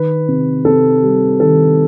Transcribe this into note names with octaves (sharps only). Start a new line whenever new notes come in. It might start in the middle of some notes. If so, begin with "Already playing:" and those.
Already playing: D#3 B4
C3
C3 A4
G3
D#3 A4